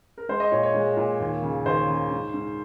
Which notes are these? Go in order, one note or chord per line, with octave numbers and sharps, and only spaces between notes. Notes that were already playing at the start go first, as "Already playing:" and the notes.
A#4
G#3 C5
D#5
A#2 C#5
C#5
G#3
A#2
D#2
C#3
D#2 C5
C#3
G#2
G#2